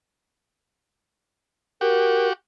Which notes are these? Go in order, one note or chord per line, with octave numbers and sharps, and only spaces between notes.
F#4 G4 A#4